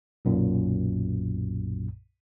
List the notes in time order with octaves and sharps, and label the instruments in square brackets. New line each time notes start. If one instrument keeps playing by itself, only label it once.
[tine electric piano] B1 F#2 A#2